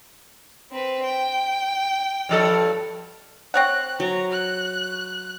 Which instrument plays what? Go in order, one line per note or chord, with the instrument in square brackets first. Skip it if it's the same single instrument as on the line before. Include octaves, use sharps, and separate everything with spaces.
[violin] C4 B4
G5
[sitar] G2 F3 A4
[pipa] C4 C#5 F#5 [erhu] F#6
[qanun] F#3 [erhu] A#5
[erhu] F#6